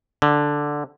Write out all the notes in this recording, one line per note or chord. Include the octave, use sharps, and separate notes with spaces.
D3